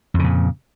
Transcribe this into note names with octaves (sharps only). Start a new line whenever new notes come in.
F2 A#2 C#3